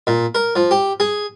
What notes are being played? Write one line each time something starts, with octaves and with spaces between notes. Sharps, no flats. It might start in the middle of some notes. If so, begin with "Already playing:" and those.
A#2
A#4
F3
G4
G#4